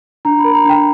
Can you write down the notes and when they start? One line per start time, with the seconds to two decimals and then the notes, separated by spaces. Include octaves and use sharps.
0.25 D4 A#5
0.39 B5
0.44 A#4
0.54 A#5
0.65 D4 G5